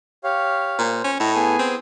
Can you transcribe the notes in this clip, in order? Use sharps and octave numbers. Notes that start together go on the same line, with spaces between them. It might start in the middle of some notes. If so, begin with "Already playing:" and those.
G4 C#5 F5
A#2 C5
C#4
A2 A4 D#5
B3 G#4 G#5
C4